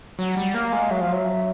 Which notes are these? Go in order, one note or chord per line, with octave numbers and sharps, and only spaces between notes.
F#3 F#5
G3
A#3 F5
G#3
F#3 E5
F3 F5
F#3 E5